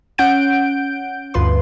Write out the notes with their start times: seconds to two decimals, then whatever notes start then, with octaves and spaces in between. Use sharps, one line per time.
0.18 C#4 F#5 G6 D7
1.34 D2 G2 F4 B4 C6